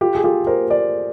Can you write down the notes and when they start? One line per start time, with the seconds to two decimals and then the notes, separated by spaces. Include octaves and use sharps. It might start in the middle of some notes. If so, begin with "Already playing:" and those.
0.01 F4 G4
0.15 G#4
0.24 F4 G4
0.47 A#4 C5
0.70 C5 D5